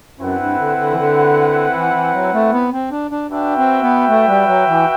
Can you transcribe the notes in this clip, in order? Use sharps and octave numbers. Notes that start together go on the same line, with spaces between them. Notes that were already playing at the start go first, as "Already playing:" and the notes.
F#2 C4 E4 B4 F#5
G2
D3
D3
E3
D3
E3
E3
F#3
A3
B3
C4
D4
D4
D4 F#4 B4 E5 G5
C4
B3
A3
G3
F#3
E3